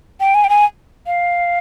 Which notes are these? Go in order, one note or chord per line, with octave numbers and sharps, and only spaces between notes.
G5
G#5
G5
G#5
F5